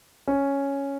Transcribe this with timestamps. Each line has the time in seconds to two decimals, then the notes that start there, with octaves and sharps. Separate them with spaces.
0.27 C#4